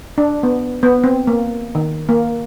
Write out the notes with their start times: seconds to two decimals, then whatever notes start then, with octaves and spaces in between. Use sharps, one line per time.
0.18 D4
0.43 B3
0.83 B3
1.04 C4
1.27 A#3
1.75 D#3
2.09 A#3